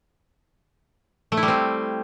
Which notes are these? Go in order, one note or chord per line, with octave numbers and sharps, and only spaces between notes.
A3
E4
G3
C4